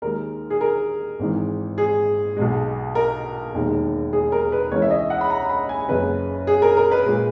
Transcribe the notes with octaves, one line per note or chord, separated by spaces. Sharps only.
D#2 D#3 G#3 A#4
G#4
A#4
G#1 G#2 E3
G#4
B1 B2 G#3
A#4
E1 D#2 D#3
G#4
A#4
B4
C#2 C#3 E3 G#3 C#5
E5
D#5
F#5
B5
A#5
B5
G#5
F#1 F#2 C#3 B4
G#4
A#4
A#4
B4
A#2 G#3